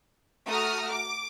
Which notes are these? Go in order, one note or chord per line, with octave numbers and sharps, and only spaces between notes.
A3 F#4 A#5 D#6 F6
D6